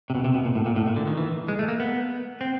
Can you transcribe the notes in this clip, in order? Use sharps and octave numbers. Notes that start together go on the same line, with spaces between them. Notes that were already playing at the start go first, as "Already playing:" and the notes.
C3
B2
C3
B2
A#2
A2
A#2
A2
A#2
D3
D#3
E3
G#3
A3
A#3
B3
C4